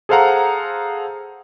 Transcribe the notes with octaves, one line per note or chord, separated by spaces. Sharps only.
G#4 A4 C5 F5 F#5 A#5